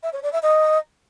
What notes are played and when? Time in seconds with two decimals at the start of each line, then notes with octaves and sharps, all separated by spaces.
0.03 E5
0.13 C#5
0.23 D5
0.33 E5
0.42 D#5